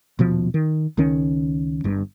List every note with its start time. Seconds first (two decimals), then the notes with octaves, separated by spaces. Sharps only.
0.19 D#1 B2 F3
0.54 D#3
0.97 C#2 D#3 C#4
1.84 G1 G2